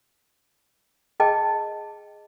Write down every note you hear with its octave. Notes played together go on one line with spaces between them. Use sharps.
G#4 D#5 G5 A5